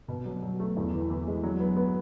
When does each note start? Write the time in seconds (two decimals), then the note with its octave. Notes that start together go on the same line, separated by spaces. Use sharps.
0.08 B2
0.25 F#3
0.42 F#3
0.60 A3
0.77 E2
0.93 E3
1.10 E3
1.27 G#3
1.43 F#3
1.60 B3
1.76 B3